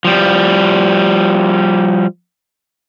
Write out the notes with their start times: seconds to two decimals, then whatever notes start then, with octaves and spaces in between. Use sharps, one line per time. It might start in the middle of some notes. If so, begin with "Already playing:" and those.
0.05 F3 G3